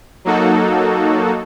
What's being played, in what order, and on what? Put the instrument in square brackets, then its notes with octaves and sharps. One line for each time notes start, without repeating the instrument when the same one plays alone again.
[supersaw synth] F#3 A#3 D#4 F#4 A4